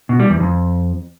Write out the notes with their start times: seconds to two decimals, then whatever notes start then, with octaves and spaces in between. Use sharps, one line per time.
0.09 B2
0.20 G3
0.30 E2
0.40 F2